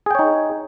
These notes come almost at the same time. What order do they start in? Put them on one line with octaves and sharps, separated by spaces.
G#4 G5 C#5 D#4